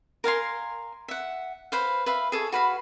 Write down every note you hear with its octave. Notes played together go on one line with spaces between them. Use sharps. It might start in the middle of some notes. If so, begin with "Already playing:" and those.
A#4 F5 G#5 C6
E5 F#5
B4 C5 F5
B4 E5 F5
G#4 A4 C#5
F#4 B4 F5 B5